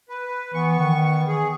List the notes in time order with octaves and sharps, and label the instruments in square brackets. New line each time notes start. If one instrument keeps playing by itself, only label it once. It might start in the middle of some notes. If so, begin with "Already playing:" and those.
[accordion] B4
[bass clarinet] E3 [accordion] B3 C#6
[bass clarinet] D#3
[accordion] G#4